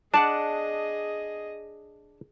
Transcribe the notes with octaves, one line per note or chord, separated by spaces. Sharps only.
D4 G#4 D5 D#5 F#5 A5